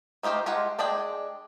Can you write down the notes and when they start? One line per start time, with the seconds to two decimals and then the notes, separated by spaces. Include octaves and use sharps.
0.23 A3 D#4 F4 G4 C5
0.46 G#3 F4 G4 F#5
0.79 G#3 D4 G#4 D5 G5